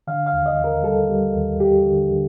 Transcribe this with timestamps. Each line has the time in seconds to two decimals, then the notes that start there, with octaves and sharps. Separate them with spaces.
0.07 D3 F5
0.27 F5
0.32 D#2
0.46 D#5
0.58 D#2
0.64 A#4
0.83 G3 A4
1.09 G3
1.34 D#2
1.60 G3 G4
1.84 D3
2.11 D3